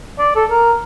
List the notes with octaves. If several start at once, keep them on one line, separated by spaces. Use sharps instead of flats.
D5
A4
A#4